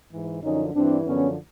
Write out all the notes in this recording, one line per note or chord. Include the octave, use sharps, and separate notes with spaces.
G#2 E3
F#2 D3 F3 C#4 D#4
G2 E3 C4 D4
F#2 D3 F3 B3 C#4